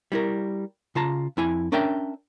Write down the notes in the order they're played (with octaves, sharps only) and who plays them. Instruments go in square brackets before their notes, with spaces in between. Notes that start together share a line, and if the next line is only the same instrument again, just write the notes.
[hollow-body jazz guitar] G3 E4 A#4
C#3 F4 A5 A#5
F2 E4 G#5
C#4 D4 A#4 E5 G5